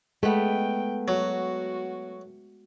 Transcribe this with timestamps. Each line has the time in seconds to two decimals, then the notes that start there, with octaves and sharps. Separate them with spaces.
0.23 G#3 A3 B3 G5
1.08 F#3 F#4